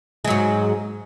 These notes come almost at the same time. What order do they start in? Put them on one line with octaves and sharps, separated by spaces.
G#3 F#3 G#2